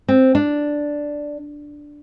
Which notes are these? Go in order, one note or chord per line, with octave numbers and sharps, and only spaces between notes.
C4
D4